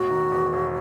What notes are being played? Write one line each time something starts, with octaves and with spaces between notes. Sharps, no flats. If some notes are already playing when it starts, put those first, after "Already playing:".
Already playing: E1 A2 F#4
D#3
E2
E1